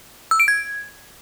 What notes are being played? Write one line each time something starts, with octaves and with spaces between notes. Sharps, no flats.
E6
D7
G#6